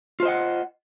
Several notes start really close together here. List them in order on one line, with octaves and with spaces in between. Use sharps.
F4 C5 D#5 F#5